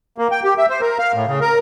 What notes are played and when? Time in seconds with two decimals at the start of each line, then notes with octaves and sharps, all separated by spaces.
0.18 A#3
0.32 G5
0.44 G4
0.58 E5
0.70 C5
0.81 A#4
0.99 F5
1.14 A2
1.27 C#3
1.41 A#4